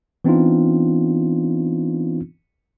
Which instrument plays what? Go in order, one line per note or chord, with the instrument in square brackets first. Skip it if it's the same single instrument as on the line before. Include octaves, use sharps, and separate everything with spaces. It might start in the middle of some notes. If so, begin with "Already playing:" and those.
[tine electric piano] E3 B3 C4 D4 D#4 F4